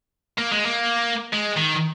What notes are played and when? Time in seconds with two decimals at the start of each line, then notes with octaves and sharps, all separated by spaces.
0.38 A#3
0.52 G#3
0.66 A#3
1.33 G#3
1.56 D#3